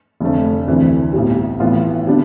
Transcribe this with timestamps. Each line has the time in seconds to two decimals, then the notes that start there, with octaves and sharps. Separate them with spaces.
0.20 F1 F2 D3 A3
0.68 D2 C3 E3
1.13 B1 A2 G3
1.60 A1 A2 E3 B3 F4
2.06 D3 G3 B3 D4